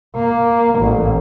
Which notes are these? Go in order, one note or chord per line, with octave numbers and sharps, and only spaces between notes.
A#3
A1